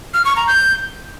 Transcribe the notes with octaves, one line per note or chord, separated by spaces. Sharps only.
F6
C#6
A#5
G6